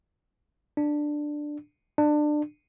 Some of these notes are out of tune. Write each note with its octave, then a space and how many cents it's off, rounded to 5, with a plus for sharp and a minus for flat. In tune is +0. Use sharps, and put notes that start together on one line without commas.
D4 +10
D4 +25